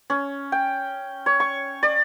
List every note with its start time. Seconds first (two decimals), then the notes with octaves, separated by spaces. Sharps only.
0.10 C#4
0.52 G5
1.26 C#5
1.40 C#6
1.83 D5